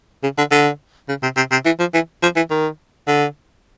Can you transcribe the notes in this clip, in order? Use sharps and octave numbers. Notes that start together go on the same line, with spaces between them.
C#3
D3
D3
C#3
C3
C3
C3
E3
F3
E3
F3
E3
D#3
D3